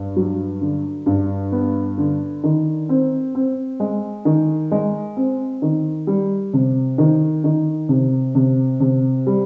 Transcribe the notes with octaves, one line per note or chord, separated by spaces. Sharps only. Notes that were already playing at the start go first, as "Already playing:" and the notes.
Already playing: G2
F#3
D3
G2
B3
D3
D#3
C4
C4
G#3
D#3
G#3
C4
D#3
G3
C3
D#3
D#3
C3
C3
C3
G3